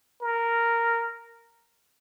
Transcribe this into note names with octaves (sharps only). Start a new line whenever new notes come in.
A#4